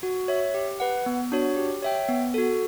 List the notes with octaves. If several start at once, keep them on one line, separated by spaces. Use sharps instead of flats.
F#4
C#5 E5
G4
B4 F#5
B3
D4 F#4 C#5
G4
C#5 E5 G5
B3
F#4 A4